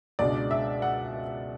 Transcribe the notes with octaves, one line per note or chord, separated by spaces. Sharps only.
C#2 B2 G#3 D4 D5
E5
F#5